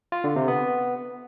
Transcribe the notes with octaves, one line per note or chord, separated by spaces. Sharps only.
F4
D3
C3
B3